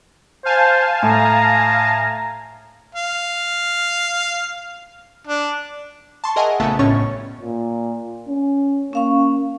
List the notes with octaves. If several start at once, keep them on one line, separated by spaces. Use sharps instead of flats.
C5 F5 G#5 A5
A2 A#5
F5
D4
A5 C6 C#6
G#4 A#4 D#5 E5 F#5 G#5
A#1 C#3 A3 B3 E5 A5
G1 A2 C#4 C#5 C#6 A6
A#2
C#4
A#3 C#4 F5 C#6